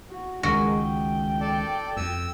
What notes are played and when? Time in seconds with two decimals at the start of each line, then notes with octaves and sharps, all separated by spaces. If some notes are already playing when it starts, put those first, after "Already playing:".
0.10 F#4
0.43 C#2 D#3 G#3 F#4 A#4
0.74 G5
1.41 A4 D5
1.97 F2 E6